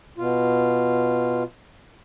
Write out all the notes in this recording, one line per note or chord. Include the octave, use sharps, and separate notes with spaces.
B2 F4